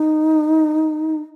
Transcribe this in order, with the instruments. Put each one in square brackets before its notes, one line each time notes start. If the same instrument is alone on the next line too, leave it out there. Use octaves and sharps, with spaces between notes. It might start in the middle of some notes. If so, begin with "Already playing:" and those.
Already playing: [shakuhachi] D#4